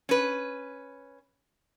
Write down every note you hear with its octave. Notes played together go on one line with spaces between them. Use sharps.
C#4 B4